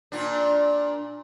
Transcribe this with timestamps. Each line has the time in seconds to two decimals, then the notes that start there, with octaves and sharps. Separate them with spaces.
0.12 A#2 D4